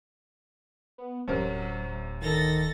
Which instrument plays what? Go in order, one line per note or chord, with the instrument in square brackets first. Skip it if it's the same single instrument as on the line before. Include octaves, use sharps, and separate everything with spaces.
[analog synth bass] B3
[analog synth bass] D1 [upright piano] F#2 C3 A#4 [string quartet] F#3
[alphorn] D#3 [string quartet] A4 A6 A#6